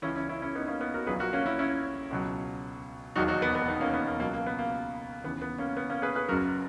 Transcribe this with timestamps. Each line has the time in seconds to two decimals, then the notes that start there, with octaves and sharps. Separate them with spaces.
0.02 C#2 C#3 E3 C#4 E4
0.15 C#4 E4
0.28 C#4 E4
0.42 C#4 E4
0.55 B3 D#4
0.68 A#3 C#4
0.81 B3
0.94 F#4 A#4
1.07 A#1 A#2 F#3 G#4 B4
1.20 F#4 A#4
1.33 A#3 C#4
1.46 C#4 E4
1.59 C#4 E4
2.11 C#2 B2 F#3
3.16 E1 D#2 D#3 F#3 D#4 F#4
3.28 D#4 F#4
3.42 B3
3.55 B3
3.68 B3 D#4
3.81 A#3 C#4
3.94 B3
4.07 A#3
4.20 C#2 B2 F#3 A#3
4.33 A#3
4.46 B3
4.59 A#3
5.24 D#2 C#3 E3 B3
5.41 B3
5.58 A#3 C#4
5.77 B3
5.90 A#3 C#4
6.02 G#4 B4
6.15 G#4 B4
6.29 F#1 F#2 C#3 F#3 F#4 A#4